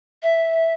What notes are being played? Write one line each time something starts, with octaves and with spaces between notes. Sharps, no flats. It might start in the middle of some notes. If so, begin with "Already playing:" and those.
E5